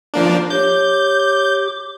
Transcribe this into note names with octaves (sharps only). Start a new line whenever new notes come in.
F3 A#3 D4
G4 C#5 D6 G6